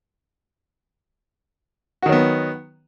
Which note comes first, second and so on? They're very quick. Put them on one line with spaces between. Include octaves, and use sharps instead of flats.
F#4 D#3 F#3 B3